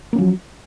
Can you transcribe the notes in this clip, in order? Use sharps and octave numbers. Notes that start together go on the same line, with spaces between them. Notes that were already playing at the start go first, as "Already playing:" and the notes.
F3 F#3 A#3 C#4